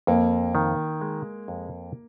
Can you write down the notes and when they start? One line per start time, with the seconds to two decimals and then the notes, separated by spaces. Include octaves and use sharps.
0.07 F2 A#3
0.55 D#3
1.01 G#3
1.48 F2